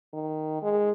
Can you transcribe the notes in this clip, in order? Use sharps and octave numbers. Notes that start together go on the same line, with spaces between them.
D#3
G#3